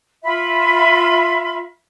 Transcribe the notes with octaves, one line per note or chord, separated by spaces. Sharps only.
F4 E5 B5